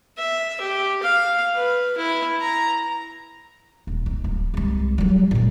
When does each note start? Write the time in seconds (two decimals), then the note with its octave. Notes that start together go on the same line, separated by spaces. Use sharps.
0.18 E5
0.60 G4
1.02 F5
1.55 B4
1.97 E4
2.41 A#5
3.87 D#1
4.06 D#4
4.24 D1
4.54 C2 G#3
4.98 F#3 G3
5.31 A#2 G#3